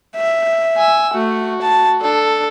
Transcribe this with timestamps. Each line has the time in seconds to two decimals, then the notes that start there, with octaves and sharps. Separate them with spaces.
0.16 E5
0.78 G#5 E6
1.14 A3 F#4
1.62 A5
2.02 D4 A4